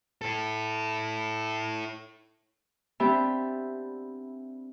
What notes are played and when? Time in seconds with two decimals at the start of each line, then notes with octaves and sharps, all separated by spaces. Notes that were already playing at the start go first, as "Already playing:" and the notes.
0.22 E4 A4
3.00 B3 C4 D4 G4 E5 B5